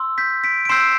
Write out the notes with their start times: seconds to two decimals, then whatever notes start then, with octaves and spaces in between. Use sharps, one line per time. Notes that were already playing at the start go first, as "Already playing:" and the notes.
Already playing: C6 E6
0.18 G6 B6
0.44 B6 D7
0.65 D7
0.69 C6 E6 G6 C7 E7